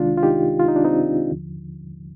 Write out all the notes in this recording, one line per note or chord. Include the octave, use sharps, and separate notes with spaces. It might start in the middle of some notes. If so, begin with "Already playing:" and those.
Already playing: C2 C3 D#3 G#3 D4 F4
F4
D#4 G4
F4
D#4
D4
C4 D#4
D#2 D3 F3